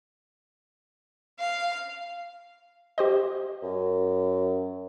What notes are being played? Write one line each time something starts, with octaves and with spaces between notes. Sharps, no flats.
F5
G4 C5 D#5
F#2